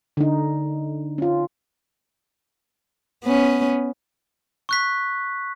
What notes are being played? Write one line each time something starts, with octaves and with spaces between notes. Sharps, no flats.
D3 D#4
C#4 F4
B3 C#4
C#6 F#6 B6